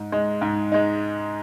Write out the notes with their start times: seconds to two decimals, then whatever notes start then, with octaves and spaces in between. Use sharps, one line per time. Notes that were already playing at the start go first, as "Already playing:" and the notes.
Already playing: G#2
0.12 G#3 D#4
0.41 G#2
0.72 G#3 D#4